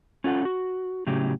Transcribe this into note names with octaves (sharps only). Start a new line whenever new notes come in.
C#4 F4 A4 F#5
F#4
A2 C#3 F#3 C#4 G4